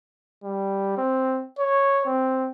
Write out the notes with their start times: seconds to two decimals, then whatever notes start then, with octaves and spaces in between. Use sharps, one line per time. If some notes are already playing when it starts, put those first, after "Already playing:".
0.44 G3
0.98 C4
1.59 C#5
2.06 C4